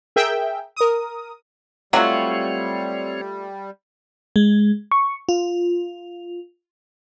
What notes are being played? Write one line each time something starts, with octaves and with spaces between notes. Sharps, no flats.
G#4 A#4 E5 G5
A#4 D#6
F#3 G3 A3 C4 F4 F#4 C#5
G#3
C#6
F4